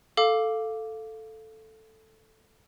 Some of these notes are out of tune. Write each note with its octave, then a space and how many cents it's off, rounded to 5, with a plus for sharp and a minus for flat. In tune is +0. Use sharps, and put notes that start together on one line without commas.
A4 +0 F5 +0 D6 +0